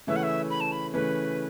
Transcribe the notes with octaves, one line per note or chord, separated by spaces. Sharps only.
C#3 E3 A3 C#4 E5
F#5
E5
B5
A5
B5
C#3 E3 A3 C#4 B4